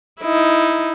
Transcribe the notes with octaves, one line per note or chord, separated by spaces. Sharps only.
D#4 E4